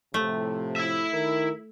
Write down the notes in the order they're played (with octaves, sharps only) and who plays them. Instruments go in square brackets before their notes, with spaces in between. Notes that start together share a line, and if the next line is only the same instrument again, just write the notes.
[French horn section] A2 C3 F3 [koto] A3
[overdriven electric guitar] E4 E5
[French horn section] D#3 A#4